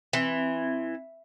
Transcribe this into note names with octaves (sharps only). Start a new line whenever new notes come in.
E3 C4